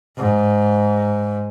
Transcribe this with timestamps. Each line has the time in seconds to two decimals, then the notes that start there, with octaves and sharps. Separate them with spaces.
0.17 G#2